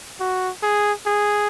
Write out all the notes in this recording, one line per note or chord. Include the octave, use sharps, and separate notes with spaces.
F#4
G#4
G#4